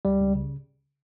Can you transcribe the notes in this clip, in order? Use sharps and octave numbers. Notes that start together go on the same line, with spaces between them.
C#2 G3
C#2
C#3